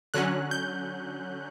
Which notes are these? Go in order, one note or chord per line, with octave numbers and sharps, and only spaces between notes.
D3 F#3 C#4 F#6
G6